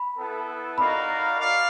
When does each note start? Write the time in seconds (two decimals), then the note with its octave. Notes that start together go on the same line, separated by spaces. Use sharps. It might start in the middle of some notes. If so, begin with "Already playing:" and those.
Already playing: B5
0.17 B3 E4 A4
0.78 D#4 F#4 A#4 D5 F5 B5
1.39 D5 F5